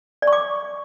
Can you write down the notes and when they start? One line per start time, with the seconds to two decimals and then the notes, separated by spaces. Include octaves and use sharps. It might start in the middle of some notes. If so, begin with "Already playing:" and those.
0.22 D5
0.27 C#6
0.33 D6